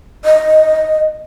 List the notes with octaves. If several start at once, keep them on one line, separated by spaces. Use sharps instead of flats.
D#5